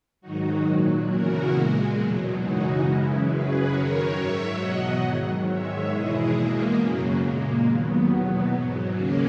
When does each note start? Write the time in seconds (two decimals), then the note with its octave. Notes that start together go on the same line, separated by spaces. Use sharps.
0.21 G#2 D#3 F#3 D#4 F#4
0.65 A#2 F#3
1.08 E2 C#3 E3 F#4 A#4
1.52 A#2 G#3
1.96 E2 B2 F#3
2.40 F#2 C#3 E3 G#3 D#4 F#4
2.83 F#2 C#3 E3 G#3 C#4 E4
3.27 F#2 C#3 F#3 G#4 B4
3.71 F#2 D#3 F#3 A#4 C#5
4.15 G#2 F#3 C#5 E5
4.58 E2 B2 F#3 D#5 F#5
5.02 G#2 D#3 F#3
5.46 G#2 D#3 G#3 C#5 E5
5.89 E2 B2 G#3 E4 G#4
6.34 E2 B2 G#3 A#3
6.77 F#2 C#3 F#3
7.22 A#2 G#3 A#3
7.65 D#2 D#3 F#3 B3
8.09 E2 B2 F#3 B3
8.53 G#2 F#3
8.96 D#2 C#3 G#3 A#3 C#4